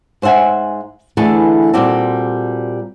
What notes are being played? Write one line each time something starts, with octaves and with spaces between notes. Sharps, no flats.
G#2 C5 E5 F#5 G#5
D3 E3 A3 G#4 A4 B4
A#2 G3 C4 F#4 G4 A4